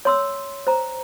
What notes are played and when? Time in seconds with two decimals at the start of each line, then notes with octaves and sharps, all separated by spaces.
0.05 C#5 C6 E6
0.67 C5 A#5